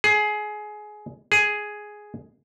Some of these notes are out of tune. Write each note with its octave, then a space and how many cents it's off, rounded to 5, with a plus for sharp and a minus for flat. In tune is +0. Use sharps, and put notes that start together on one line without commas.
G#4 +20
G#4 +5